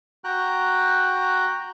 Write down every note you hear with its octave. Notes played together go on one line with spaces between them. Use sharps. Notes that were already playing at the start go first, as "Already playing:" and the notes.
F#4 G5 A#5 F#6